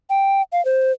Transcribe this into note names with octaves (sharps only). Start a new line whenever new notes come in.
G5
F5
C5